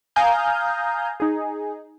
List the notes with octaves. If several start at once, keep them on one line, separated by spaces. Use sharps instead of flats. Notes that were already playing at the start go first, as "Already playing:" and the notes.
F5 G#5 A#5 D#6 F6 G6
D#4 G#4